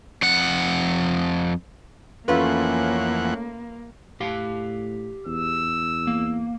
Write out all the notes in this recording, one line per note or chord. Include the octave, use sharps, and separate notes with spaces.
F2 F#5
F2 E3 A3 A#3 C#4 F4 B4 F#5
A2 G4 F5
E2 E6
A#3